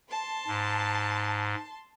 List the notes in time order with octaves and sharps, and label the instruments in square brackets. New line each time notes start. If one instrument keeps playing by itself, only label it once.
[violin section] A5 C6
[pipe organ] G#2